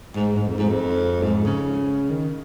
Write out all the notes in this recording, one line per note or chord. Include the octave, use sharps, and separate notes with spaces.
G#2
G#2
F2
G#2
F2
G#2
C#3
D#3